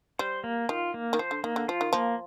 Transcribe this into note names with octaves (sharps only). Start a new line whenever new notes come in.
G3 C5
A#3
D#3 F4
A#3
D#3
F3 C5
D3
D#3 A#3
D3
F3 F4
D#3
F3 A#3